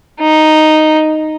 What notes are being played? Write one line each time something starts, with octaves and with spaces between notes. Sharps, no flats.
D#4